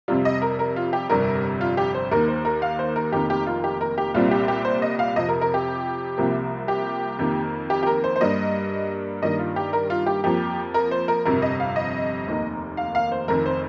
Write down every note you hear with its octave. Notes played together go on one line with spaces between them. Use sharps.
F2 C3 G3 F4
D#5
A#4
A#4
F4
G4
G1 F2 C3 G3 A#4
F4
G4
C5
D#2 D#3 A#3 A#4
C5
A#4
F5
C5
A#4
F1 F2 D#3 A#3 G4
G4
F4
G4
A#4
G4
C2 A#2 G3 C4 F4
G4
G4
C5
D#5
F5
F2 C3 F3 D#5
A#4
A#4
G4
C2 C3 F3 A#3
G4
F2 D#3 A#3
G4
G4
A#4
C5
C5
G2 G3 A#3 D#5
G2 D#3 G3 A#3 D#5
F4
G4
A#4
F4
G4
F2 F3 A#3 G4
A#4
C5
A#4
G1 F2 C3 A#4
D#5
F5
D#5
F1 D#2 D#3 A#3
F5
F5
C5
F1 F2 D#3 A#4
C5